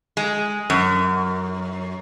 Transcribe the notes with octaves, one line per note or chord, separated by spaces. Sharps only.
G#3
F#2